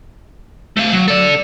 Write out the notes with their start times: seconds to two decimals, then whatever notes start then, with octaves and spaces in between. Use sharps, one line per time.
0.77 A3 F5
0.93 F#3
1.08 A4 D5